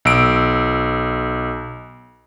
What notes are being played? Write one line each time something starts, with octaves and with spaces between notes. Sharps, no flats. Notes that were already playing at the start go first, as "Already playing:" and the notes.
B1 E6 D7